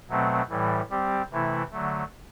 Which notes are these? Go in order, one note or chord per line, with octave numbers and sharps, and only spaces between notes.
B2 F#3 A3 C4
A2 E3 G3
G3 C4 G4
C3 E3 A3 E4
D3 F#3 A3